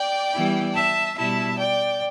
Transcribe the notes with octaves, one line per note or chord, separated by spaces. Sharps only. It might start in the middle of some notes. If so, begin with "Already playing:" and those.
Already playing: D5 G5
E3 G3 B3 E4
E5 A5
B2 G3 E4 E5 A5
D5 G5